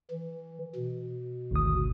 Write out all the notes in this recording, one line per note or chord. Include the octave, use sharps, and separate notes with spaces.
E3
B2
G#1 D2 D#6